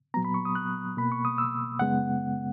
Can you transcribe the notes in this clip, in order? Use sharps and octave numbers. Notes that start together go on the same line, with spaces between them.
A#2 F#3 B3 A#5
B5
C#6
D#6
F#6
B2 A#3 B5
C#6
D#6
E6
F#2 C#3 G#3 B3 F#5